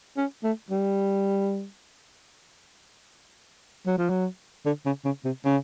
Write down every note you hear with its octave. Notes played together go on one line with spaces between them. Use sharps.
C#4
A3
G3
F#3
F3
F#3
D3
C#3
C#3
C3
C#3